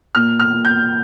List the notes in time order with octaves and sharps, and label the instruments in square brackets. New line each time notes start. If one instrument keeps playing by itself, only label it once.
[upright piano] A#2 F6
F6
A#2
G6